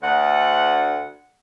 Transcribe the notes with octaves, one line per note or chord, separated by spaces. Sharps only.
D2 F#5